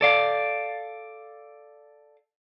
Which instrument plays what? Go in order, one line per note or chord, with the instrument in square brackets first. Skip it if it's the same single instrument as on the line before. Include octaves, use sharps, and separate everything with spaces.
[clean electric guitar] A4 D5 F5